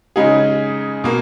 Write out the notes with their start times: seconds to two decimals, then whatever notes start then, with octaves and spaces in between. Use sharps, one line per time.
0.16 C#3 G#3 D#4 G#4
1.04 B2 A#3